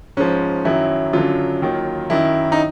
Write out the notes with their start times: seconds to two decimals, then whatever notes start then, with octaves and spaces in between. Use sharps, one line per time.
0.17 G#2 F3 C#4
0.65 F#2 D#3 F#3 E4
1.13 F#2 D3 F#3 F4
1.62 D#2 D#3 F#3
2.10 F#2 D#3 F#3 E4
2.52 D#4